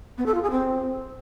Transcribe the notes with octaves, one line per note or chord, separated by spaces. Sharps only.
B3
A4
F4
G#4
C4